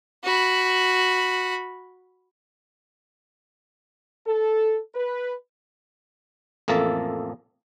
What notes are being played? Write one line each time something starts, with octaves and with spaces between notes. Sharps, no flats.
F#4 B5
A4
B4
A1 F2 A#3 A4 E5 A5